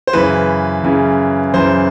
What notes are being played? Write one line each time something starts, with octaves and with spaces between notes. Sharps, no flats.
C5
F#2 C#3 E3 B4
F#2 C#3 E3
F#2 C#3 E3 C5